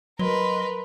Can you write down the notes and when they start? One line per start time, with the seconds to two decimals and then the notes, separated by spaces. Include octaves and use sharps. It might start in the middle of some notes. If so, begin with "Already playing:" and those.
0.19 F#3 A#4 B4 D#5 C6